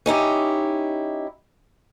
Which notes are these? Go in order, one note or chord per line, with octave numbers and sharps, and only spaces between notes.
C#4 D#4 E4 G4